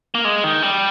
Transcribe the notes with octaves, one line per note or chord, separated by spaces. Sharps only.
A#3
G#3
D#3
G3